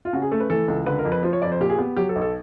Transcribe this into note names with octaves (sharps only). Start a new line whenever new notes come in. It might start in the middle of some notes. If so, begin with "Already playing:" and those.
F4
C#3 F#4
G#4
A3 A4
B4
E3 A4
C#2
D3 B4
A#4
F2
B4
F3 C5
C#5
F2 D5
C5
A#2 G4
G#4
B3 G4
F#3 G4
A4
B1
A4